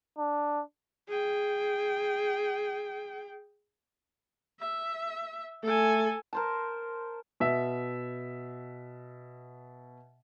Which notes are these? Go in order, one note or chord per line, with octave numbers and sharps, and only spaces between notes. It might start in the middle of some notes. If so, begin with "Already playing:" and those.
D4
G#4 G5
E5
A3 A4 G#5
A#4 C5 A5
B2 E5